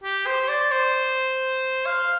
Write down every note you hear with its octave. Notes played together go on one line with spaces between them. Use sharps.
G4
C5
D5
C5
F5